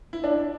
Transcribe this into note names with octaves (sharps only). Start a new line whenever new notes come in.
E4
D4